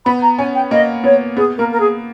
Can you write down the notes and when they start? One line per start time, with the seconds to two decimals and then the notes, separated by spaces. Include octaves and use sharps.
0.05 B3 B5
0.22 A#5
0.39 C#4 G#5
0.55 G5
0.71 A#3 D#5
1.04 B3 C#5
1.37 B3 G#4
1.58 A#3 A#4
1.72 A#4
1.80 G#4